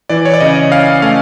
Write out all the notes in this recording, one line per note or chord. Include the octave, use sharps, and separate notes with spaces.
E3 D5
C#5
D5
C#3 D#5
C#4 F5
A3 F5